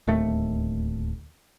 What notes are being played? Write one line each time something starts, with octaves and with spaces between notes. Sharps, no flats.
D1 D#2 A3